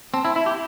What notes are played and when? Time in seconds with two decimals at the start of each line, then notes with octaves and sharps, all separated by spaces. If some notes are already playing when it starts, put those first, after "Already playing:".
0.14 C4 A5
0.25 E4
0.35 E4 E5
0.46 G4